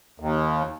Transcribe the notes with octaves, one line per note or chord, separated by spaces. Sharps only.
D#2